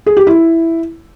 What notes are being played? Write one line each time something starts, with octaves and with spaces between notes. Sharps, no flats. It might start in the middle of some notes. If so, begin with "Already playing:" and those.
G#4
G4
E4